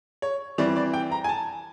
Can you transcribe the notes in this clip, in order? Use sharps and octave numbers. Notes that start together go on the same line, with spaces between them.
C#5
E3 G3 C4 D5
D5
G5
A#5
G#5
A5